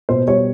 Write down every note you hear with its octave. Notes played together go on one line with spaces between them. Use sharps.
B2 C5
G3 C#5